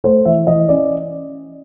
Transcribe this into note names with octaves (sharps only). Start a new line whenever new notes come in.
A3 C5
E3 E5
E3 D#5
C#4 D5